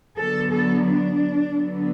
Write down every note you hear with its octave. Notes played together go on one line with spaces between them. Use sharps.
D3 F#3 B3 A4
A4
D4
D3 F#3 B3